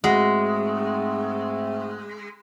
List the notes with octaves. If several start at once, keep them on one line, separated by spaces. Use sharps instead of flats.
G#2 G#3 A3 C4 F#4